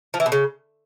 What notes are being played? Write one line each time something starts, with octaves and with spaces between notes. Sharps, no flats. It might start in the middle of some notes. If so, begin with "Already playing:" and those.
F3
E3
B2
C#3